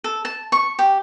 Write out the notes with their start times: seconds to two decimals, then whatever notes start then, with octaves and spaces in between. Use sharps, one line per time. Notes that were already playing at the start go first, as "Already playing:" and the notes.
0.04 A4
0.25 A5
0.52 C#6
0.79 G4